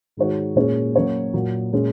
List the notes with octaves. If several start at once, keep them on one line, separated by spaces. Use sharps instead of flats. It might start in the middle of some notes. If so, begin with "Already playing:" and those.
G#2 D#3 G#3 F#4 C#5
A#2 G#3 C#4 G#4 C#5
F#3 A#3 C#4 F#4 C#5
A#2 F#3 A#3
A#2 G#3 C#4